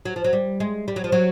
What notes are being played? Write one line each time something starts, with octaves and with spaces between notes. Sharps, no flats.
F#3
F3
F#3
G3
G#3
G3
F#3
F3
F#3